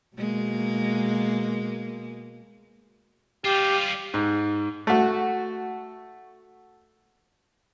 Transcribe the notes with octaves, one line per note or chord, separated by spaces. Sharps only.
B2 G#3 A#3
G3 F4 G4
G#2
A3 F#4